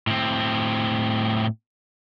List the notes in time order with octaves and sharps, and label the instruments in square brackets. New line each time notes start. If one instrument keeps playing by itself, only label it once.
[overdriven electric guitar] A2 C4